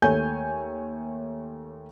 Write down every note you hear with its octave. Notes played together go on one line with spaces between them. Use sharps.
D#2 A3 C#5 G#5 G6